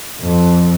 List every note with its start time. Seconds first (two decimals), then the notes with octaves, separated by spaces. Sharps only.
0.22 F2